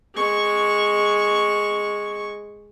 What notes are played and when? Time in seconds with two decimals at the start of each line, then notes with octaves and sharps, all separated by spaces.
0.15 G#3 C#6